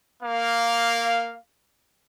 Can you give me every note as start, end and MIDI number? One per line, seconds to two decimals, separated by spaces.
0.22 1.37 58
0.22 1.37 77